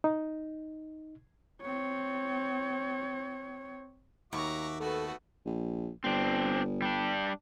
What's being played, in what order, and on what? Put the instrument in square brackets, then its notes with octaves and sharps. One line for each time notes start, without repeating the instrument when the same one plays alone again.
[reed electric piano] D#4
[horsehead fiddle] C4 C#5
[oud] D#2 [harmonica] F#4 E5 D6 [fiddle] A#5 C#6
[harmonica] A3 B3 [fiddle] F#4 B4 [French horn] A4
[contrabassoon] A#1
[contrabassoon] G1 [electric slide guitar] C4 D4
[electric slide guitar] G3 D4